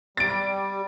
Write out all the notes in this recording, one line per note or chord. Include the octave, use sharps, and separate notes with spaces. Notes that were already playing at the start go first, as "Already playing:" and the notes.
G3 A6 D7